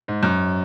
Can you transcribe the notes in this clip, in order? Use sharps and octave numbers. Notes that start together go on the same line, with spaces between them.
G#2
F#2